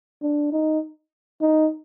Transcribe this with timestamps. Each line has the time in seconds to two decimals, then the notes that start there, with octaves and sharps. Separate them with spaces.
0.22 D4
0.52 D#4
1.41 D#4